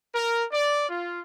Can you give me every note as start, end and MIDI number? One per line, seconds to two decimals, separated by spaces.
0.14 0.44 70
0.51 0.88 74
0.89 1.19 65